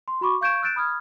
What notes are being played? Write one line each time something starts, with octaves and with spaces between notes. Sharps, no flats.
C6
F#4 B5 C#6 D6
F5 C#6 G6 G#6 D7 E7
E6 F#6 G6 A6 D7 E7
B5 D#6 F6 G#6